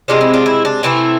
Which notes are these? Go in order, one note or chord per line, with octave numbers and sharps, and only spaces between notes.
C3 G#3 C4 D4 F4
E4
D4 F4
E4
D4
C3 E3 A3 C4 E4